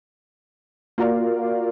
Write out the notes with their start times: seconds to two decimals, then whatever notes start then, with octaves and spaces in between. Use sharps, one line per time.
0.98 A#3 F4 F#4 A#4 D5 F5